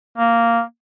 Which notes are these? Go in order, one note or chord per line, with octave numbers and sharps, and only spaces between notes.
A#3